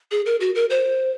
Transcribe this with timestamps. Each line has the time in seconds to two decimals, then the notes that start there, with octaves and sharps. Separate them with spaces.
0.11 G#4
0.26 A#4
0.41 F#4
0.55 A#4
0.70 C5